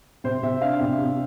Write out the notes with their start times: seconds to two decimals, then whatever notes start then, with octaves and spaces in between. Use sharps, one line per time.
0.24 C3 C5
0.43 C3 E5
0.61 D4 F5
0.81 C3
0.98 C3